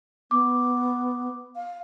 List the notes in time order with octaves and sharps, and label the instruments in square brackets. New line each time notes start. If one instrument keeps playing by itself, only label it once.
[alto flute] B3 [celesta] D6
[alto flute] F5